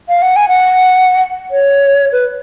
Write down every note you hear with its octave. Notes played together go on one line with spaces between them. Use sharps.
F5
F#5
G#5
F#5
C#5
B4